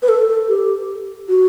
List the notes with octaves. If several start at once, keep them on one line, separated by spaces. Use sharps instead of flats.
B4
A4
A4
G4
F#4